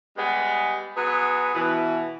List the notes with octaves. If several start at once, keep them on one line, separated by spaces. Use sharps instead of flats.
G3 G#3 B3 G#4
F#3 B3 G#4 B4
B2 E3